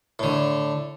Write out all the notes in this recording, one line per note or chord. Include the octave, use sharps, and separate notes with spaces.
A2 D3